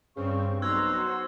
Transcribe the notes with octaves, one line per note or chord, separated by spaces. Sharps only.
G2 C#3 C4 C#6
B1 C5 A#5 E6 F#6 G#6
F#4